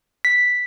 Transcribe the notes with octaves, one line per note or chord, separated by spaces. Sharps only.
B6